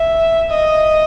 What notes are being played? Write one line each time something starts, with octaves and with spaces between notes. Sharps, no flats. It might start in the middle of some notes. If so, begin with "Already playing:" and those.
Already playing: E5
D#5